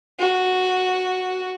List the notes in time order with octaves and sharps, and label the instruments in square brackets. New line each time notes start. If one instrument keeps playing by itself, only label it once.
[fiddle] F#4